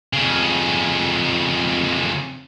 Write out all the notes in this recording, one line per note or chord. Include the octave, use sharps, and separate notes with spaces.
F2 C#3